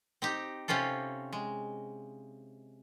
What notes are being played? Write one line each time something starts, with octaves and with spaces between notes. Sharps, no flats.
C4 D#4 G4
C3 C4 C#4 F4 A4
G#3